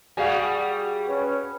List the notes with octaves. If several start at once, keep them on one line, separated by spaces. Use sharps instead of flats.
G3 F#4 G#4 F5 G#5
C#4 B4 C#5